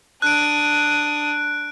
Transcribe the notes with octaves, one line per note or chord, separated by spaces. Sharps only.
D4 D#6 F#6 D7